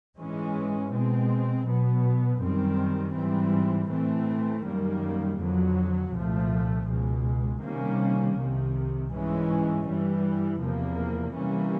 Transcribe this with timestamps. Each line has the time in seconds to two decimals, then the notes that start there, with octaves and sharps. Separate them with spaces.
0.17 G#2 E3 G#3 C#4
0.92 B2 G#3 C4
1.66 B2 F#3 B3
2.41 F#2 D#3 G3 C4
3.15 G#2 E3 G3 C4
3.90 A2 E3 A3 C4
4.64 F#2 D#3 G3 A#3
5.39 F2 D3 F#3
6.13 C2 A#2 F3 A3
6.88 C#2 B2 G#3
7.62 C3 D#3 G3 A#3 C#4
8.37 C2 C3 D#3
9.12 G#2 E3 G#3 C#4
9.86 G2 E3 G3
10.61 E2 C3 F3 A#3
11.35 C3 E3 G3 A#3 C#4